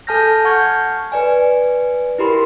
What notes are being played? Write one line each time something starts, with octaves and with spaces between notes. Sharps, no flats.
A4 G#5 A5 F6 G6 A#6
F#5 A5 C#6 F6 G6 G#6
B4 D5 G#5
E4 G4 A#4 B5 C6